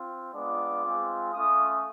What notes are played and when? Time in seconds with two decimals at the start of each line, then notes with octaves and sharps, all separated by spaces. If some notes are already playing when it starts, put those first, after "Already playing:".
Already playing: C4 F4
0.33 G#3 B3 D4 F4 D6
0.83 G#3 C4 F4
1.33 A3 C#4 F4 D#6